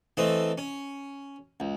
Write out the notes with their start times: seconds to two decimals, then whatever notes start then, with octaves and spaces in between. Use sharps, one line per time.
0.17 E3 A3 C4 D#5
0.58 C#4
1.60 C#2